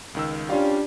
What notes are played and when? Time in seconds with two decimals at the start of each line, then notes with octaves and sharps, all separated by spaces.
0.15 C#2 D#3 E6
0.50 G3 C#4 D4 F4 F5